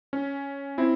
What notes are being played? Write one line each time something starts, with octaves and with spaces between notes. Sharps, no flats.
C#4
C4 E4